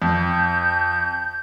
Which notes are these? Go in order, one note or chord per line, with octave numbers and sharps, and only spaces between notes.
F2 G6